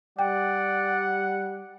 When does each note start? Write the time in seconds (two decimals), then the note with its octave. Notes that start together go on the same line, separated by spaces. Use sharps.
0.19 G3 D5 F#5 G5